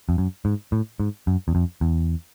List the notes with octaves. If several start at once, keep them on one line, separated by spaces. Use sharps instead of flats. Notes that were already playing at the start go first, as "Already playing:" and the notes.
F2
F#2
G#2
A2
G#2
F#2
E2
F2
E2